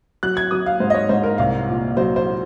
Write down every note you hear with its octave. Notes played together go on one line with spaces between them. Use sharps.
F#3 F#6
G#6
F#3 D#6
F5
G#2 C5
D#5
C#5
G#2 C5
A#4
C2 F5
A#2
F#3 C5
C5